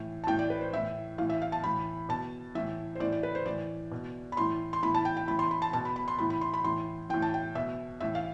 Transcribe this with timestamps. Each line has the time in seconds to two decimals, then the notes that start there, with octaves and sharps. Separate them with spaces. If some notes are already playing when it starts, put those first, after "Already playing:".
Already playing: A2 E3
0.24 A5
0.27 A2 E3 G5
0.39 D5
0.50 B4
0.61 C5
0.73 A2 E3 E5
1.18 A2 E3 F5
1.30 E5
1.42 F5
1.52 A5
1.64 A2 E3 B5
2.09 B2 A5
2.55 A2 E3 E5
2.95 C5
3.00 A2 E3 D5
3.12 D5
3.23 B4
3.35 C5
3.46 A2 E3 D5
3.92 B2
4.32 B5
4.37 A2 E3 C6
4.73 C6
4.82 A2 E3 B5
4.94 A5
5.05 G5
5.17 G5
5.27 A2 E3 B5
5.39 C6
5.51 B5
5.62 A5
5.73 B2 A5
5.85 B5
5.96 B5
6.08 C6
6.19 A2 E3 B5
6.30 B5
6.41 C6
6.54 B5
6.64 A2 E3 C6
7.09 A2 E3 G5
7.22 A5
7.34 G5
7.55 B2 E5
8.00 A2 E3 E5
8.15 F5